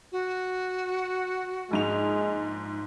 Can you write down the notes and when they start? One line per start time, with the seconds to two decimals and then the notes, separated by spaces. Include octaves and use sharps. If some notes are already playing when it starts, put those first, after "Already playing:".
0.12 F#4
1.71 A#1 G#2 G#3 F7